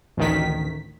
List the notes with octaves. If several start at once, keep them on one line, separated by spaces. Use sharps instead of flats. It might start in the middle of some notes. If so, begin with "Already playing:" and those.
A1 D2 D#3 B6